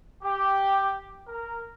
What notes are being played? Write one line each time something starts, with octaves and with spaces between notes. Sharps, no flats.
G4
A#4